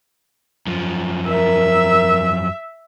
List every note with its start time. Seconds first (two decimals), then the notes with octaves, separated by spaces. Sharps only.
0.67 F#2 F3
1.27 A#4 E5